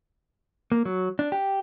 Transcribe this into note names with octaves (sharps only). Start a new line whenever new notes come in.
A#3
F#3
D4
G4